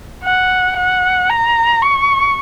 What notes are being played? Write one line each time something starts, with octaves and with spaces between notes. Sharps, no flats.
F#5
F#5
A#5
C#6